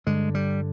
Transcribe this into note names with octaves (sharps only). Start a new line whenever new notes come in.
G2 D3 G#3
G3